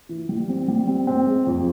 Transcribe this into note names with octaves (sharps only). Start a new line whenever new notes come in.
E3
G3
C4
G3
C4
C4
G#3
F2